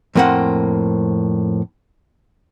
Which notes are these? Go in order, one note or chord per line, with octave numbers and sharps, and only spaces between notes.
F2 A2 A#3 C4 F#5